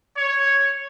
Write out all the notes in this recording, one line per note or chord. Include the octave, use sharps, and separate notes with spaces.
C#5